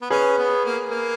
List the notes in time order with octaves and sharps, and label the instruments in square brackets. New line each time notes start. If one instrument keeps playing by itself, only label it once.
[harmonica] B3
[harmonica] C#4 [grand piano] G#4 B4
[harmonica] B3
A#3
A#3